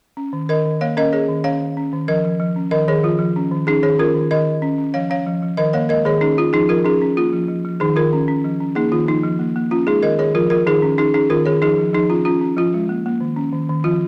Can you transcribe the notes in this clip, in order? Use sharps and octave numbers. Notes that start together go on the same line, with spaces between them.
C#4
D#3
D#3 A#4 D#5
D#3
A#3 C#5 F5
C#4 A#4 D#5
C#4 G#4 C#5
D#3
C#4 C#5 F5
D#3
C#4
D#3
F3 A#4 D#5
F3
F3
C#4
D#3 A#4 D#5
D#3 G#4 C#5
F3 F4
F3
C#4
D#3
C#4 D#4 G#4
D#3 G#4 C#5
C#4 F4 A#4
D#3
D#3 A#4 D#5
D#3
C#4
C#4
F3 C#5 F5
C#4 C#5 F5
F3
F3
D#3 A#4 D#5
A#3 C#5 F5
G#3 A#4 D#5
D#3 G#4 C#5
C#4 D#4 G#4
C#4 F4
F3 D#4 G#4
F3 F4 A#4
C#4 D#4 G#4
C#4
A#3 F4
F3
F3
F3
D#3 D#4 G#4
D#3 F4 A#4
C#4
C#4
F3
C#4
A#3 D#4 G#4
D#3 F4
F3 D#4
F3
A#3
A#3
C#4 F4
G#3 D#4 G#4
D#3 A#4 D#5
D#3 G#4 C#5
F3 F4 A#4
F3 F4 A#4
D#3 D#4 G#4
C#4
C#4 D#4 G#4
C#4 D#4 G#4
D#3 F4 A#4
D#3 G#4 C#5
F3 D#4 G#4
F3
F3 D#4 G#4
C#4 F4
C#4 F4
C#4
F3 F4
G#3
A#3
A#3
D#3
C#4
D#3
D#3
F3 F4